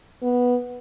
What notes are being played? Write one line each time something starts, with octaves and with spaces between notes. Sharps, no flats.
B3